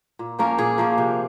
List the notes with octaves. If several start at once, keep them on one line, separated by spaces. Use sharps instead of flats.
A#2
F3 A#3 C#4 A#4
A#2 G#4
F3 A#3 C#4
C3